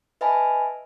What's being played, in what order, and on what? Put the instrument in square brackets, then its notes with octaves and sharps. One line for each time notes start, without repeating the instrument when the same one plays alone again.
[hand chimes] B4 D#5 E5 G#5 A5 B5